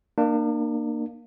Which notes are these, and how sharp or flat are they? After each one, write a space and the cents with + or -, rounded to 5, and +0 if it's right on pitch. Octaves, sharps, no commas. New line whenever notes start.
A#3 +0 D4 +40